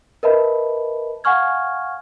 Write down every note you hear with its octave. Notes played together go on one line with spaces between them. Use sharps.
A#4 B4 D#5 E5 A5 B5
F5 F#5 G#5 C#6 F6 G#6